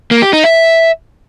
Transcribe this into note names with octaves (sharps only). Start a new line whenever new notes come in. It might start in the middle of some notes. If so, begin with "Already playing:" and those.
A#3
G4
D#4
E5